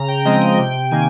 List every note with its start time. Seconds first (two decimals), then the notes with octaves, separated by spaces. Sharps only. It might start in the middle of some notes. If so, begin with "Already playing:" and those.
Already playing: C#3 A#5
0.08 G5
0.25 F3 G#3 C4 D#5
0.42 G5
0.58 C3 G5
0.91 D#3 A#3 G#5